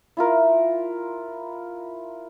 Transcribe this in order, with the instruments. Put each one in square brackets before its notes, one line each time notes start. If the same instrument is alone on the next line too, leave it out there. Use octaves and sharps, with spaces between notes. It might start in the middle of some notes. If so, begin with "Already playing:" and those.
[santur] E4 F4 A#4